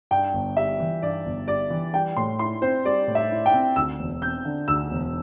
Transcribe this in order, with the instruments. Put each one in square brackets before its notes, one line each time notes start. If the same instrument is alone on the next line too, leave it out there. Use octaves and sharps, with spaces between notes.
[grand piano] G2 [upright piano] G5
[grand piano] G1
[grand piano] G3 [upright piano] E5
[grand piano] E3
[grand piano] G2 [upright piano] D5
[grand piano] G1
[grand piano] G3 [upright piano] D5
[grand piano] E3
[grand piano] G3 [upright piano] G5
[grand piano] A2 [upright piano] C6
[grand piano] E4 [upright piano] C6
[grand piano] C4 [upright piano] C5
[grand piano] G3 [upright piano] D5
[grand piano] A2
[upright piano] E5
[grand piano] E4
[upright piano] G5
[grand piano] C4
[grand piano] D2 [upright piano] E6
[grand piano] E1
[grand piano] C4 [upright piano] G6
[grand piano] D3
[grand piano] D2 [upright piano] E6
[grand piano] E1